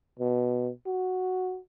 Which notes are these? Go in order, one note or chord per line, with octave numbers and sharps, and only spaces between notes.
B2
F#4